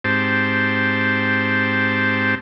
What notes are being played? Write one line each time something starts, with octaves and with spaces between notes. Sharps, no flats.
G#2 C4 G4 C5 A5